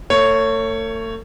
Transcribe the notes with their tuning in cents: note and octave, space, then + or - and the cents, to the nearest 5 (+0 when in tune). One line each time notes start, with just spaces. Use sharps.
A3 +40 C#5 +0